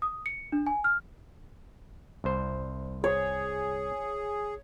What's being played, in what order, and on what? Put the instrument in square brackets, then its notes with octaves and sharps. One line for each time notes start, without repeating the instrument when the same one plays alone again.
[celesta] D#6
C#7
D4
G#5
F6
[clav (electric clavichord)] C2 C5
[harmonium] G#4 [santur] C#5